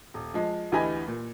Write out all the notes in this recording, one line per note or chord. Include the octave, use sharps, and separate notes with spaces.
D#1
F3 G#3
D2 E3 G4 D#5 G#5 B5
A#2